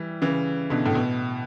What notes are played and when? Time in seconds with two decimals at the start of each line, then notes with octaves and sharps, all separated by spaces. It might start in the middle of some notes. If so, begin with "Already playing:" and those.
Already playing: E3 G3
0.22 C#3 E3
0.70 B2 D3
0.86 A2
0.95 B2